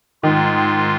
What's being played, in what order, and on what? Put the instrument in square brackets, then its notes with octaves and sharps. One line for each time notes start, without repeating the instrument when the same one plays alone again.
[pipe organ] G#2 G#3 F4 [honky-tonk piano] D#3